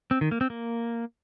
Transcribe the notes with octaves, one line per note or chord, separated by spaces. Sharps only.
C4
D#3
A#3
C4
A#3